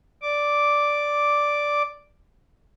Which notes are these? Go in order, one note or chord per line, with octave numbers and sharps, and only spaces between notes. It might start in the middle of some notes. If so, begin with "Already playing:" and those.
D5 D6